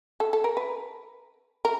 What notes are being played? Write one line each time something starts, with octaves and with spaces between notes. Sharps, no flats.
A4
A4
A#4
B4
A#4